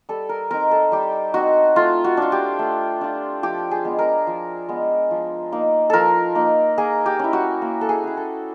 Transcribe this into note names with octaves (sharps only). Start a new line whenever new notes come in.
G3 A4
A#4
C4 D#4 A#4
A4
G3 G4
C4 D#4 F#4
A3 F4
F#4
D4 F4
G4
A3
D4 F4
F3 G4
G#4
G#3 B3
A#4
F3
G#3 B3
F3
A#3 D#4
F3 A4 A#4
A#3 D#4
A#3 G#4
G4
C#4 E4
F#4
A#3
A4
G#4
C#4 E4
A4